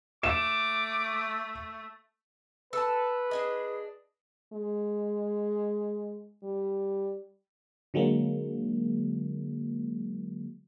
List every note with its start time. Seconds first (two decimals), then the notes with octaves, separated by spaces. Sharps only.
0.23 A3 D6 E7
2.73 A4 B4 A5
3.31 D4 G#4 D#5
4.53 G#3
6.44 G3
7.94 D3 F#3 G#3 A#3